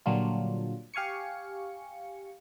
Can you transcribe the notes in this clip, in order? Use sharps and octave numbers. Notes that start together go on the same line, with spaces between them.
A#2 D3 F#3 G3 D4 F4
G4 F5 G#5 C#6 C#7